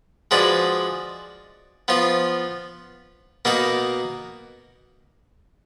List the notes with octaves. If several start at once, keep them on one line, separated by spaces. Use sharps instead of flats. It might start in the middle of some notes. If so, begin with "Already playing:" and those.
F3 G#3 D4 F#4 B4
F3 B3 F4
B2 A#3 D#4 F#4 A#4